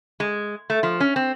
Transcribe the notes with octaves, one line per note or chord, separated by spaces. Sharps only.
G#3
A3
F3
C#4
C4